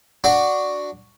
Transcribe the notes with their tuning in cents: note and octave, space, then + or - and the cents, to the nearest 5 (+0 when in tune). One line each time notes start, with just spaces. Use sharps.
D4 +0 F#4 +0